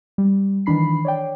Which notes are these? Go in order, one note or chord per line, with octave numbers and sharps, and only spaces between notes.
G3
D#3 E3 D4 B5 C7
C#5 D5 G5